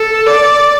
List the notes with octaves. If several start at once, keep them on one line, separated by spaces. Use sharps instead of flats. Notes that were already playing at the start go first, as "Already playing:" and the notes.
Already playing: A4
D5